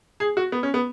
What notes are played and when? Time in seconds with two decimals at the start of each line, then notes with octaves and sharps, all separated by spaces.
0.20 G#4
0.37 F#4
0.52 B3
0.63 C#4
0.74 B3